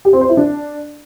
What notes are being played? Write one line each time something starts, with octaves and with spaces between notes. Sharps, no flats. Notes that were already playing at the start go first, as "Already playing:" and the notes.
G4
C4
C5
E4
D4